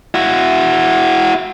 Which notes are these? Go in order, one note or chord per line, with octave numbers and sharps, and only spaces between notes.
E4 F#4